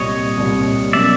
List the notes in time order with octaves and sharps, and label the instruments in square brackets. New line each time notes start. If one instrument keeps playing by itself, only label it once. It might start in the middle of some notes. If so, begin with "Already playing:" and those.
Already playing: [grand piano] C2 A#2 G3 [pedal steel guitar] C#5 D#5
[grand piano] C2 A#2 G3
[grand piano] B2 F#3 A#3 C#4 [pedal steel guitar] D5 E5